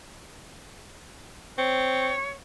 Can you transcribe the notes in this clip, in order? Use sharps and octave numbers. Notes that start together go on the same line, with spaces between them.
C4 C#5